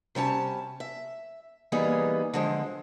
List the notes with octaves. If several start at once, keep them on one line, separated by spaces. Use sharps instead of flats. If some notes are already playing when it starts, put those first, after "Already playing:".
C3 G3 C#4 A5
E5
E3 G3 A#3 B3 D#4 G#4
D3 F3 G#3